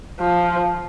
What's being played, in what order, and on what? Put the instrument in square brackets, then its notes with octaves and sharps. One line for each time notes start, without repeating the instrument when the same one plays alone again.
[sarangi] F3